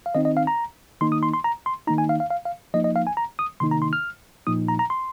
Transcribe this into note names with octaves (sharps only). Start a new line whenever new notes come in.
F5
D#3 C4 D#4 D#5
D#5
F5
A#5
D#3 A#3 D#4 C6
D#6
C6
C6
A#5
C6
D#3 A#3 D#4 A#5
G#5
F5
F5
F5
F5
F3 A#3 D#4 D#5
D#5
F5
G#5
A#5
D#6
C3 D#3 A#3 D#4 C6
A#5
C6
F6
A#2 F3 A#3 D#4 D#6
A#5
A#5
C6